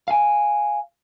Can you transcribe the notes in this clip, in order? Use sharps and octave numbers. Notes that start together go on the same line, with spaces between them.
F5 G#5